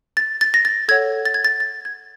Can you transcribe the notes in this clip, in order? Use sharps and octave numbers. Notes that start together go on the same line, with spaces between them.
A6
A6
A#6
A6
A4 C#5 F#5 G#6
A6
G#6
A6
A6
G#6